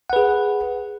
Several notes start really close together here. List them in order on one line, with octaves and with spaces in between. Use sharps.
F#5 B4 G#4